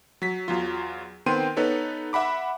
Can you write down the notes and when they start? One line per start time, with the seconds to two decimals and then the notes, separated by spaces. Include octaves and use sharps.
0.22 F#3 B6
0.48 E2 F#3 F4
1.26 D#3 B3 C4 G5 C6 D#7
1.57 B3 D#4 A4 B4 C#5
2.13 E5 F#5 B5 D6